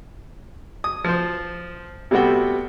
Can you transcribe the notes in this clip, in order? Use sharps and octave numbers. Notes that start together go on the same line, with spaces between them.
D#6
F3 C5
C3 G3 A3 B3 F#4 G5